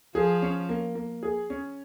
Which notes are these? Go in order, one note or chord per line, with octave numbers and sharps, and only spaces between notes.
F3 G#4
C#4
A#3
A#3
G#4
C#4